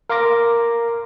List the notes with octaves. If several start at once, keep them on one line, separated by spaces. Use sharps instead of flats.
A#4 F5 C6 D6 A#6